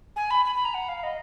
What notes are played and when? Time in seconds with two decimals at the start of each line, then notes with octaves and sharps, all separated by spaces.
0.16 G#5
0.31 B5
0.45 B5
0.55 B5
0.65 A#5
0.74 F#5
0.89 F5
1.03 D#5